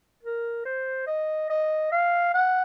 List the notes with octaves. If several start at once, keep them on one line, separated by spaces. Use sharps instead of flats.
A#4
C5
D#5
D#5
F5
F#5